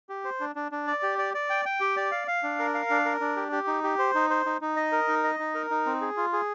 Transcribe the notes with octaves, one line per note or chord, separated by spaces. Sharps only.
G4
C5
D4
D4
D4
D5
G4
D5
D5
G5
G5
G4
D5
F5
F5
D4
A#4
F5
D4
A#4
D4
G4
G4
D#4
G4
C5
D#4
C5
D#4
D#4
D#5
A#4
D#4
D#5
D#4
A#4
D#4
C4
G#4
F4
G#4